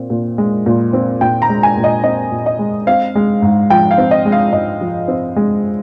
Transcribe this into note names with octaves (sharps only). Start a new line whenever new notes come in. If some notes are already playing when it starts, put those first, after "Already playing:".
Already playing: A#2 C4
A#2
G#3
A#2
C4
A#2 G5
A#5
G#3
G#5
A#2
D#5
C4 D#5
A#2
D#5
G#3
C4 F5
G#3
G#2
F3 G5
F5
C4
D#5
G#3
F5
G#2 D#5
F3
C4
G#3